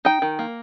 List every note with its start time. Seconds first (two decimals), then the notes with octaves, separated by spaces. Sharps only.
0.05 D#4 G5
0.22 D#3
0.39 A#3